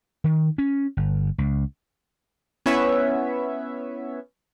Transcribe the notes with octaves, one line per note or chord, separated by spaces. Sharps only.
D#3
C#4
G1
C#2
B3 C#4 E4 B4 C#5 E5